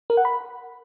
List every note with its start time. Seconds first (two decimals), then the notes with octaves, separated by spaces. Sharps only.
0.10 A#4
0.17 F#5
0.25 B5